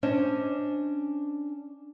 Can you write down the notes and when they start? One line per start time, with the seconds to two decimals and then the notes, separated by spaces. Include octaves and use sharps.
0.03 C#4 D4 C5 D#5